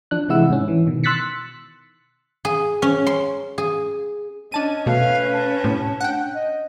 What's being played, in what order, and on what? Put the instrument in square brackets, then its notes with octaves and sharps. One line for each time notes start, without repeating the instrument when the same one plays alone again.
[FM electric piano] F3 D4 F#6
C3 E3 G#3 E4 F#5 E6
G#2 C#4
E3
B2 D#3
C6 E6 F#6 A6 B6 C#7
[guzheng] G#4
C#4
C6
G#4
[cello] C#4 [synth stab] D4 A5 D#7 [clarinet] D#5
[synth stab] B2 A3 [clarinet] B4 [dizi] F5
[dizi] A5
[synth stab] A2 C3
[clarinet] D4 [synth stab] F#5 G5
[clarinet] D#5